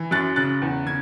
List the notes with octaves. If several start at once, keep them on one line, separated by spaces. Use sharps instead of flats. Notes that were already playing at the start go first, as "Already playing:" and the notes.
Already playing: E3
F#2 F#6 A6
C#3 F#6 A6
E2
C#3 G#6